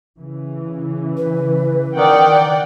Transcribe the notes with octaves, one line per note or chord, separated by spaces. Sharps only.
C#3 E3
B4
D#3 D5 F#5 G5